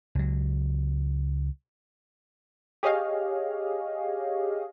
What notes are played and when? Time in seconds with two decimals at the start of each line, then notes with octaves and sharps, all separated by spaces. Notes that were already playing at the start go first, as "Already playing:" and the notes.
0.15 C#2 F#3
2.83 G4 G#4 C#5 D#5 F5